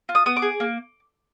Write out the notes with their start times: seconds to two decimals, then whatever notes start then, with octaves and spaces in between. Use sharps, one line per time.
0.09 F4
0.15 D#6
0.26 B3 D#6
0.37 D6
0.42 G#4
0.60 A#3